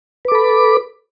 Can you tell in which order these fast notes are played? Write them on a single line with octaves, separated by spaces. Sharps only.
B4 D6 A4 B5